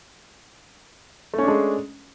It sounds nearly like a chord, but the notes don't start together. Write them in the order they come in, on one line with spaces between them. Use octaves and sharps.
A3 C#4 D4 G#3